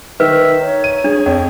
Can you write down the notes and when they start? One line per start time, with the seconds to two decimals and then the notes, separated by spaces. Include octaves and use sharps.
0.20 D#3 B4 E5
0.60 D#4 C#5
0.84 D#7
1.04 D4 G#4
1.26 F2